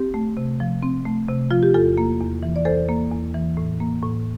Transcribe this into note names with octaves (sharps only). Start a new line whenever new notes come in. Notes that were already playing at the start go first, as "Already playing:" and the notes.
Already playing: C4 G4
A3
C3
F3
C4
A3
C3
F3 F4
G4
E2 F4 A4
A#3
E2
E3
D5
E2 A4 C5
A#3
E2
E3
A2
A#3
A2